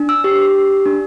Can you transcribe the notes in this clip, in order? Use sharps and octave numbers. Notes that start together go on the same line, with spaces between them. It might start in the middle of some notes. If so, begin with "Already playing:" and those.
Already playing: D4
E6
G4
G4
D4